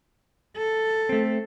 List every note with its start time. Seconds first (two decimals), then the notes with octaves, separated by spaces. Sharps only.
0.56 A4
1.09 A3 C4